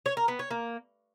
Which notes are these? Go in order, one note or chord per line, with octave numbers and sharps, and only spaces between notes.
C#5
A#4
B3
C#5
A#3